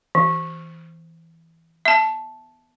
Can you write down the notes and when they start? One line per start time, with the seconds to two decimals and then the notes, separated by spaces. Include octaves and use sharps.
0.15 E3
1.85 E5 A5